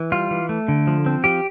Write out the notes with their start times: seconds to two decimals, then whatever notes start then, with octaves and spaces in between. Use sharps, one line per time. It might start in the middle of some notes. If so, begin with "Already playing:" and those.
Already playing: E3
0.12 G3 F4
0.31 E3
0.49 A3
0.68 D3
0.87 F3
1.06 C4
1.24 F3 G4